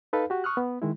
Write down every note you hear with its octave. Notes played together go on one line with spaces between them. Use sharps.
D#4 A4 B4 F5
F#4 G4
C#6 D#6 F6 F#6
B3
D#3 G#3 E4